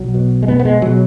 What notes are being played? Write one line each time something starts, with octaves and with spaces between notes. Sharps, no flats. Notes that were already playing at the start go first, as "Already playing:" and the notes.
Already playing: B1 F#3
B2
G#3
B2 B3
B3
G#3
B2 F#3